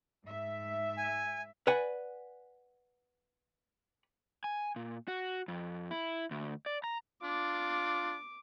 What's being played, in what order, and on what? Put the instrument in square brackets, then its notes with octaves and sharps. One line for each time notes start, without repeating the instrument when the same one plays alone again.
[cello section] G#2 E5
[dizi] G#5
[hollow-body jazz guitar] B4 D5 F#5 G#5
[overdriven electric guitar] G#5
A#2
F#4
F2
E4
D2
D5
A#5
[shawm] D4 [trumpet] F4 [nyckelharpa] D6